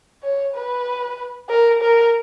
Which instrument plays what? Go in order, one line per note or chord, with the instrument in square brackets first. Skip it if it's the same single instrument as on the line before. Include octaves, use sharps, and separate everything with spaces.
[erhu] C#5
B4
A#4
A#4